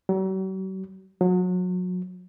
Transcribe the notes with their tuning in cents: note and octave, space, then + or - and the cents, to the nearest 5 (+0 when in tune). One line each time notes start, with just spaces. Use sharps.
F#3 +45
F#3 -30